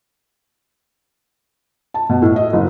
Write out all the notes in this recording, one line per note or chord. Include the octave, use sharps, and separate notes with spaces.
A5
B2
A2
D#5
F#1